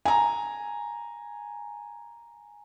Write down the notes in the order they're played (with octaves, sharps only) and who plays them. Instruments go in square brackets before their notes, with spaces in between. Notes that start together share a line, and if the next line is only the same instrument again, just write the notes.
[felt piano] G#5 A#5